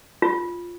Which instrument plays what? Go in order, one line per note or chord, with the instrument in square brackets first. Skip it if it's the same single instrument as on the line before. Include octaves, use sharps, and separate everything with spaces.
[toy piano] F4